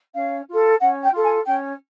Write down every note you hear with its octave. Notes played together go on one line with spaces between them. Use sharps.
C#4 F5
F4 A4
C#4 F#5
G5
F4 A4
G#5
C#4 G5